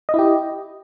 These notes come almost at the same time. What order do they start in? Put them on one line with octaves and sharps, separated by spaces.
D#5 E4 G4